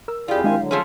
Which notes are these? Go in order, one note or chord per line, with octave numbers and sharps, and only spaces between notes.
A#4 E6
F2 E4 F4 G4 G#4 D5
D#3 G#3 C4 D4 E4 F5 G#5
D3 F#3
F3 A3 C#4 G#4